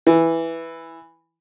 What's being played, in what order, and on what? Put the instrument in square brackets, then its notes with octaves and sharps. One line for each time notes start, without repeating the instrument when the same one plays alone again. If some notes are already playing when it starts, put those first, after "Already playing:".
[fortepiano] E3